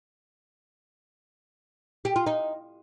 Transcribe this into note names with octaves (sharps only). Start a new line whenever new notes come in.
G4
F4
D#4